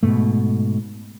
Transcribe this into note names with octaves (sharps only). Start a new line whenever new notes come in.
G#2 B2 A3